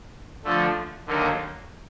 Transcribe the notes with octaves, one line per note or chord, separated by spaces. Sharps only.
D3 F3 A3
D#2 D3 F#3 A#3 D#4